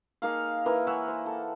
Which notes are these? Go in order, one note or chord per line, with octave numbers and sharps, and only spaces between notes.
A#3 D#4 G#4 F5
E3 A#3 A#4
C#5 E5 F#5 G#5
C5
A4